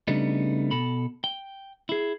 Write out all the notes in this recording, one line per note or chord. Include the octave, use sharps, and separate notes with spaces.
C#3 G3 A3 B3 D4 D#4
B2 A4 B5
G5
E4 G#4